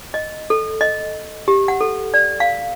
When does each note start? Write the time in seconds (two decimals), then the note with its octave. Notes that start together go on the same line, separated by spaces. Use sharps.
0.14 D#5
0.50 A4
0.81 D#5
1.48 G4
1.68 F#5
1.81 A4
2.14 D5
2.40 F5